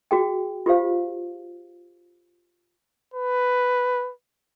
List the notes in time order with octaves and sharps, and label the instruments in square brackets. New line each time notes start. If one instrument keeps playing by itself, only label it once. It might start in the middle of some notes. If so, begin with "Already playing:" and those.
[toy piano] F#4 G#4 G5
F4 G4 C5 F5
[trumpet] B4